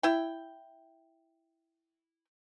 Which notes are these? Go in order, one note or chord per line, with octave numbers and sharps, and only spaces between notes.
E4 G5